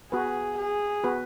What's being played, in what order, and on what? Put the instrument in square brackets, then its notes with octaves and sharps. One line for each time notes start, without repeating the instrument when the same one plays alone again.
[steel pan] B3 F#4 B4 [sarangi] G#4
[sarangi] G#4
[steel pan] B3 F#4 B4